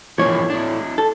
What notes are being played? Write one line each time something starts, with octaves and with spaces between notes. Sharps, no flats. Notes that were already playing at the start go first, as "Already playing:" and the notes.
A2 E3 F3 A#3 C#5
D4 E4
A4